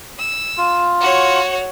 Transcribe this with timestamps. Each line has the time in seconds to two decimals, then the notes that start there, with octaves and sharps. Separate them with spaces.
0.19 E6
0.58 F4
1.01 F#4 C#5